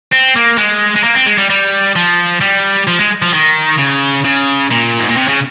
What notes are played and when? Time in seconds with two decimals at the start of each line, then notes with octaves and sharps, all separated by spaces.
0.12 C4
0.36 A#3
0.58 G#3
0.96 G#3
1.04 A#3
1.16 C4
1.27 G#3
1.38 G3
1.50 G3
1.96 F3
2.41 G3
2.87 F3
2.99 G#3
3.22 F3
3.34 D#3
3.79 C#3
4.25 C#3
4.71 A#2
4.99 G#2
5.08 A#2
5.17 C3
5.28 C#3